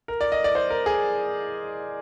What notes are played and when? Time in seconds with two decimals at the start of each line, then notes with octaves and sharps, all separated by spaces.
0.08 A#4
0.21 D5
0.32 D#5
0.44 D5
0.55 C5
0.70 A#4
0.86 G#4